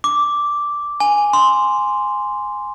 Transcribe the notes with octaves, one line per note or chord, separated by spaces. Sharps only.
D6
G#5
C6